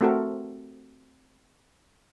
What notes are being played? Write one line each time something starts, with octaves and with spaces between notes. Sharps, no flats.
A3 C4 F#4 A4 A#4